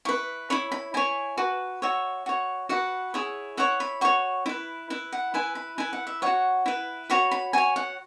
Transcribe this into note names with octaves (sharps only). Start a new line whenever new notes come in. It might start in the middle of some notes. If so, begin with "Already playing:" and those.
E4 B4 C#6
E4 C#5 B5
B5
E4 C#5 G#5
F#4 B4
F#4 C#5 E5
F#4 C#5
F#4 B4 F#5
E4 G#4 C#5
E4 C#5 F#5
B5
F#4 C#5 C#6
E4 B4
E4 B4
F#5
E4 B4 G#5
B5
E4 B4 G#5
F#5
E5
F#4 C#5 F#5
E4 B4
F#4 C#5 B5
B5
F#4 C#5 G#5
F#5